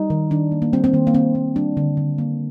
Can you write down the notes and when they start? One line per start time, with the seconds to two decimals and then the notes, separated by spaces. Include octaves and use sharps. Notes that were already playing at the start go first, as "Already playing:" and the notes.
Already playing: G3 D#4
0.10 D#3
0.31 D#3 D4
0.52 A#3
0.62 A#3
0.73 G3 C4
0.84 C4
0.93 D#3 A#3
1.07 A#3
1.14 D#3 C4
1.35 A#3
1.56 G3 D4
1.77 D3
1.97 D3
2.18 A#3